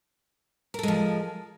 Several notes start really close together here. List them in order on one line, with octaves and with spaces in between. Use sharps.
A#4 A4 G#3 F3